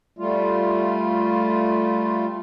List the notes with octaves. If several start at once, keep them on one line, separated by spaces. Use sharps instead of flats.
G3 A3 F4